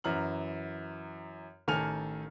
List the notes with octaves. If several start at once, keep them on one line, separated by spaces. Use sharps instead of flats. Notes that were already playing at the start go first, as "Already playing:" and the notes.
F#2 E3 A#5 F6 F#7
A1 D#3 A4 G#5 F6 F7